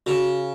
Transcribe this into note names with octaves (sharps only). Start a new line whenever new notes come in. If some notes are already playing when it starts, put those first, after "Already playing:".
C#3 F#4